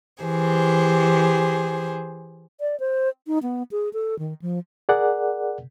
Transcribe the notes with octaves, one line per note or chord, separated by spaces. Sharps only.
E3 G4 G#4 C5
D5
C5
D#4
B3
G#4
A4
D#3
F3
G#4 A#4 D5 F#5